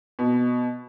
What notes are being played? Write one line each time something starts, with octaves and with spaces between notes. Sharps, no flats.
B2